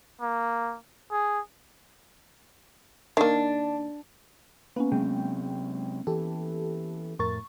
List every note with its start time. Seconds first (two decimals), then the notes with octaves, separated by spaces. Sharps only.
0.21 A#3
1.12 G#4
3.17 D#3 A#3 D4
4.76 A#3 B3 C#4 B4
4.91 C3 F#3 G#3 C4 G5
6.07 E3 G4 A4
7.19 F2 A2 A#4 C#6 A6